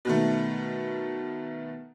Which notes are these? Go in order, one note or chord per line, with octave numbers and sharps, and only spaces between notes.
B2 D#3 A3